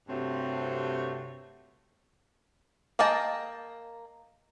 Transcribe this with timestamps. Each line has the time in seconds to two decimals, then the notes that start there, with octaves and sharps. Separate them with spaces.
0.08 G2 C3 A3 C4 F#4 C#5
2.99 A#3 G#4 D#5 G5 A5